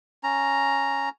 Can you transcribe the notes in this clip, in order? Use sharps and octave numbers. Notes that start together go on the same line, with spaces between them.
C#4 A#5